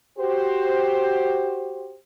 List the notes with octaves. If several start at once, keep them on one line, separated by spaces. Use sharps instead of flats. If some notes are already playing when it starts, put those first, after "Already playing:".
F#4 G4 C5